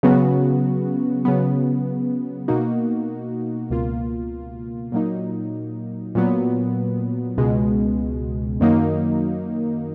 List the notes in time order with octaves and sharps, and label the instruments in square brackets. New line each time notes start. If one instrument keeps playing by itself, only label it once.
[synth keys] C#3 F#3 B3 F#4
C#3 F#3 B3
B2 A#3 D#4 F#4
C#2 B2 A#3 F4
A#2 F#3 A#3 D#4
A#2 F#3 B3
C#2 B2 G#3
F#2 D#3 F#3 A#3 D#4